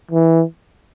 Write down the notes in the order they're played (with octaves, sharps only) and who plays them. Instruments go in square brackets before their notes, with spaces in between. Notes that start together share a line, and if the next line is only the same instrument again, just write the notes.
[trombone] E3